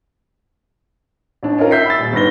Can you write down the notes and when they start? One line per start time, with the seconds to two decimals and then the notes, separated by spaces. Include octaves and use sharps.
1.43 A1 D4
1.58 C#4 D#4 F4 A#4
1.71 E5 G6 B6 C7
1.85 B5 E6 A6
2.00 D#1
2.13 G1 G#2 B4 A#6 G7